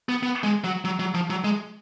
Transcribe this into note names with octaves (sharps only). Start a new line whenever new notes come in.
B3
B3
G#3
F#3
F#3
F#3
F3
F#3
G#3